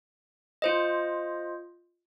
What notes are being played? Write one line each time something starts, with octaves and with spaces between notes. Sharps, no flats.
F4 C5 D#5